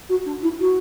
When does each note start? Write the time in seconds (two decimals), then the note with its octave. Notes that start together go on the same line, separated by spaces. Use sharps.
0.09 F#4
0.26 D4
0.42 E4
0.60 F#4